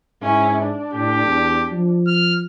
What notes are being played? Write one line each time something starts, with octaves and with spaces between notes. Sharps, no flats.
G#2 C#4 E4
D4
A2 G4
E2
F3
F6